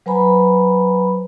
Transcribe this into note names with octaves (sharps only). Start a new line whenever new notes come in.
F#3 B4 C5 G#5 A#5 B5